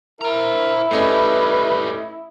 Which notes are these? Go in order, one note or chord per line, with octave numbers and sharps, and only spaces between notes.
E4 A#4 C5 A#5
A2 G3 A3 C#4 B4 D#5